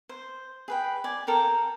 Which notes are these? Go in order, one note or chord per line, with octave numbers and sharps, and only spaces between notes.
C5
G#4 B4 G5
D5 G#5
A4 A#4 G5 A#5